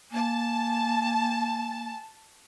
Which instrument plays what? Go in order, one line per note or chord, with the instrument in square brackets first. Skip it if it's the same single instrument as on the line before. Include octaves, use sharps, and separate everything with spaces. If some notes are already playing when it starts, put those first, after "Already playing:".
[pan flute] A#3 [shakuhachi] G#5 [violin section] A5